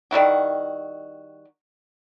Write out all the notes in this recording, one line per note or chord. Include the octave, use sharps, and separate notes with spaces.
D#3 G3 E4 F#4